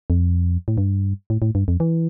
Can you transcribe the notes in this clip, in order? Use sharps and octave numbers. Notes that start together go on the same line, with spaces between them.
F2
A2
G2
A2
A2
G2
F2
E3